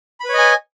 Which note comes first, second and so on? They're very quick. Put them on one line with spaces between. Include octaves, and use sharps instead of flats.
B5 B4 C#5 D#5 G#5